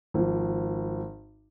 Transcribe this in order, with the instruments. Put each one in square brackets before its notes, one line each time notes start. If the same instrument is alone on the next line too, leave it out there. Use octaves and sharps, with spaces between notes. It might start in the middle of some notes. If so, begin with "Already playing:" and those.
[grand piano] G#1 F3